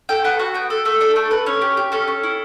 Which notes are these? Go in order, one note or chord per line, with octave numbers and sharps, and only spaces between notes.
A4 G5
B3 F#5
F#4 F#5
B3 G5
A4
A3 A4
D4 A4
A3 A4
A4 B4
C#4 C#5
G4
G4
C#4 A4
C#4
E4